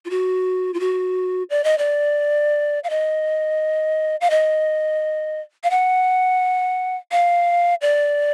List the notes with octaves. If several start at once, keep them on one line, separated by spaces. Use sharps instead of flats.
F4
F#4
F4
F#4
D5
D#5
D5
F5
D#5
F5
D#5
F5
F#5
F5
D5